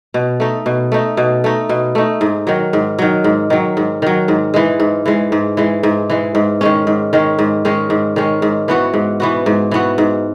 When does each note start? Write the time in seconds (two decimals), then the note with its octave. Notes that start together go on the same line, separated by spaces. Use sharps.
0.14 B2
0.40 A3 D#4
0.66 B2
0.92 A3 D#4
1.17 B2
1.44 A3 D#4
1.69 B2
1.95 A3 D#4
2.21 G#2
2.47 D#3 F#3
2.73 G#2
2.98 D#3 F#3
3.24 G#2
3.50 D#3 F#3
3.77 G#2
4.02 D#3 F#3
4.28 G#2
4.54 E3 G#3
4.80 G#2
5.06 E3 G#3
5.32 G#2
5.57 E3 G#3
5.83 G#2
6.10 E3 G#3
6.35 G#2
6.61 D#3 G#3 C#4
6.87 G#2
7.13 D#3 G#3 C#4
7.39 G#2
7.65 D#3 G#3 C#4
7.90 G#2
8.16 D#3 G#3 C#4
8.42 G#2
8.68 E3 B3 F#4
8.94 G#2
9.20 E3 B3 F#4
9.46 G#2
9.71 E3 B3 F#4
9.98 G#2